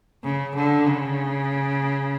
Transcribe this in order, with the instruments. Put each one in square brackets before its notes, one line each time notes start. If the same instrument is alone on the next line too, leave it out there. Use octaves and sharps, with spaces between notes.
[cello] C#3
D3
C#3